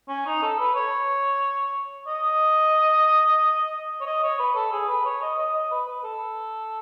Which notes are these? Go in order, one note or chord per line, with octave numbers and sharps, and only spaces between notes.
C#4
D#4
A4
B4
C#5
D#5
C#5
D#5
C#5
B4
A4
G#4
B4
C#5
D#5
D#5
D#5
B4
B4
A4